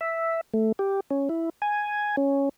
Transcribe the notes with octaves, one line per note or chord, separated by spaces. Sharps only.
E5
A3
G4
C#4
E4
G#5
C#4